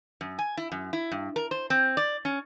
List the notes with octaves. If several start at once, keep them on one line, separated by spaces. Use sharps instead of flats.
F#2
G#5
E4
F#2
E4
G2
A#4
C5
C4
D5
C#4